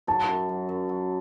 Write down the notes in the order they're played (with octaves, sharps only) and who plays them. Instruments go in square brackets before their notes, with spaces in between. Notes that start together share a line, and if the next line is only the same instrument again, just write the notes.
[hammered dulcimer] F#3 [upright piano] A5
[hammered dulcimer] F#2
F#3
F#2
F#3